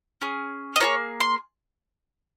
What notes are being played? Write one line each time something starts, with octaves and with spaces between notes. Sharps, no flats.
C#4 G#4
D#5
A#3 F4 G#4 C#5
C6